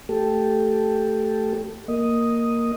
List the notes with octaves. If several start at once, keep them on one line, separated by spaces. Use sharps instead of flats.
A3 G4 A4
A#3 D#5